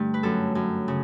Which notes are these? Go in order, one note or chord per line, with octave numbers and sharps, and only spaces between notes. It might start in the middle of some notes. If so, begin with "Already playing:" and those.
Already playing: G2 D3 A3
B4
F#2 A4
F#2
C#3